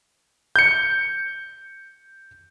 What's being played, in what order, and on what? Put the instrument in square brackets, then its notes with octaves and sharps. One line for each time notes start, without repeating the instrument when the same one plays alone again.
[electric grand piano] G6 C#7